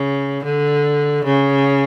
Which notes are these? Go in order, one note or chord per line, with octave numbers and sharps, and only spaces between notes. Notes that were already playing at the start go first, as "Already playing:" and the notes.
Already playing: C#3
D3
C#3